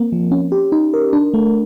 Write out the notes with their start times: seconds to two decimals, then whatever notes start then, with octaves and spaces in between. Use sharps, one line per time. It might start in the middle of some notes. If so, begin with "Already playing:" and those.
Already playing: A#3 C4
0.12 F3
0.31 C#4
0.52 G4
0.72 D#4
0.94 A#4
1.13 D4
1.34 A3